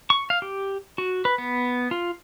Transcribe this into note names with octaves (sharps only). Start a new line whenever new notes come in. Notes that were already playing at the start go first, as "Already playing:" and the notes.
C#6
F5
G4
F#4
B4
B3
F4